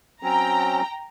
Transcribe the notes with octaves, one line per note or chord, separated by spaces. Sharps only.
F#3 C4 C#4 G5 A#5